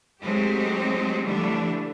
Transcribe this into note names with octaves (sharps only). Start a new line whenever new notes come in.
F#3 G#3 A3 C4 D#4 G4
D3 E3 F3 G3 A3 D4